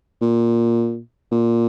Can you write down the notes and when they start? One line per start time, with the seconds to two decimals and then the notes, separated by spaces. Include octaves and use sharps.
0.21 A#2
1.32 A#2